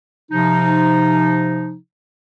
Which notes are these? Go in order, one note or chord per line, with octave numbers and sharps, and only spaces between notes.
C3 F3 D#4